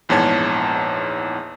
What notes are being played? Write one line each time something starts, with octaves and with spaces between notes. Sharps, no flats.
A#1 E2 G#2 C#5 A5 G#6